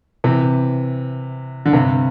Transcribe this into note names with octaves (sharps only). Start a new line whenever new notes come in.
C3 E3
D3
G2 C3